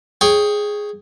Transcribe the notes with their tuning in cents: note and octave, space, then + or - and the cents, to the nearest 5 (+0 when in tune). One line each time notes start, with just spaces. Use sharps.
G#4 +0 C#5 +0 G5 +20